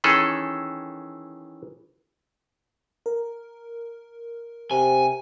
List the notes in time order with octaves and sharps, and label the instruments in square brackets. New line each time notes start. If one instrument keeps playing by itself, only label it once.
[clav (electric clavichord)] D#3 E3 C#4 G#4 A4
[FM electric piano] A#4
[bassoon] C3 [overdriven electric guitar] G#5